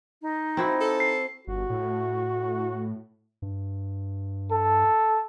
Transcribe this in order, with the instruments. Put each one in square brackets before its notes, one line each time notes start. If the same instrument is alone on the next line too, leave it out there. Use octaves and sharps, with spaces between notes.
[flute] D#4
[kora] C4 E4 F#4
[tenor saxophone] A4
[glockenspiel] C7
[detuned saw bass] G1 [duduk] F#4
[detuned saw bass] A2
[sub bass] G2
[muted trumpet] A4